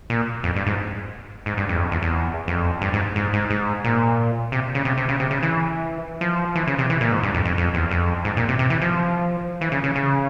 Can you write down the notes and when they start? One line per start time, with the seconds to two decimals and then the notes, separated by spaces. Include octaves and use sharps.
0.10 A#2
0.44 F2
0.56 G2
0.67 G#2
1.46 G#2
1.57 G2
1.69 F2
1.75 E2
1.80 F2
1.91 E2
2.02 E2
2.48 F2
2.81 G2
2.93 G#2
3.16 G#2
3.33 G#2
3.50 G#2
3.84 A#2
4.52 C3
4.75 C#3
4.85 C3
4.97 C3
5.08 C#3
5.20 C3
5.31 C#3
5.43 E3
6.21 F3
6.55 E3
6.67 C#3
6.78 C3
6.90 E3
7.01 A#2
7.11 G#2
7.23 G2
7.34 F2
7.45 F2
7.58 F2
7.74 E2
7.91 F2
8.25 G#2
8.37 A#2
8.48 C3
8.59 C3
8.70 E3
8.81 F3
9.61 E3
9.72 C#3
9.84 C#3
9.95 C#3